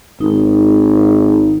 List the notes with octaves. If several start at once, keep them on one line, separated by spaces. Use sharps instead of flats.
G#1 D#4